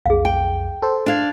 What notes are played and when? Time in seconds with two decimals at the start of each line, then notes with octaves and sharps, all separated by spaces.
0.06 B1 F2 G#4 F5
0.25 G5
0.82 A4 C5
1.06 D4 F5 G#6 A6